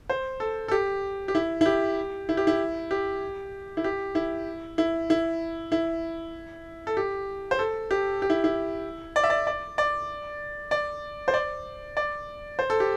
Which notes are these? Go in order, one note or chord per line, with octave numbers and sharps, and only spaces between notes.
C5
A4
A4
G4
G4
E4
E4
G4
E4
G4
E4
G4
E4
G4
E4
E4
E4
E4
A4
G4
C5
A4
G4
G4
E4
E4
D5
E5
D5
D5
D5
D5
C5
D5
D5
C5
A4
G4